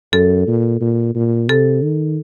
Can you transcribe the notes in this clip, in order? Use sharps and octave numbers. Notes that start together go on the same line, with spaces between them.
F#2 A4
A#2
A#2
A#2
C3 A4
D#3